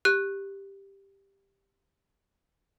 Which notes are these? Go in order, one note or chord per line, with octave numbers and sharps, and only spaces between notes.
G4 F#6